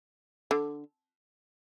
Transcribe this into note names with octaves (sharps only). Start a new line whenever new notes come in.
D3